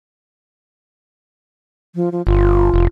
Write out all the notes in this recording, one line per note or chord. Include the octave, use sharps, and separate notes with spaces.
F3
F3
G1 F4
F1